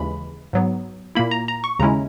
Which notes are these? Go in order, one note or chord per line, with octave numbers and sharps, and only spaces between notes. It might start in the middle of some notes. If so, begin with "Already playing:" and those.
Already playing: D#2 C#3 E3 G#3 B5
G#2 F#3 B3
A#2 A#3 E4 B5
A#5
A#5
C#6
D#2 C#3 G#3 C#4 E4 A#5